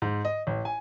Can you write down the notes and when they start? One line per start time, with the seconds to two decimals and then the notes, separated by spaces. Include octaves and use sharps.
0.02 G#2
0.25 D#5
0.47 A1
0.65 G#5